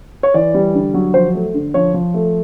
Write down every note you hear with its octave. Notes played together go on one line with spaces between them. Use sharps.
C#5
E3 D5
G3
D3
F#3
F3 C5
A3
D3
F3 C#5
F3
A3